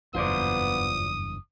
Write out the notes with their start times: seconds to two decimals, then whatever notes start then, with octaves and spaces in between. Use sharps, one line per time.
0.15 F#1 E2 G2 B3 F4 C5 D5 D#6